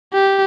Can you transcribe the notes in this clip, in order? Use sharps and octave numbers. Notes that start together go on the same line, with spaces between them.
G4